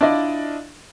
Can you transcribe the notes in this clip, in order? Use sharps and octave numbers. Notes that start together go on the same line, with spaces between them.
D4 E4 F4 D5 D#5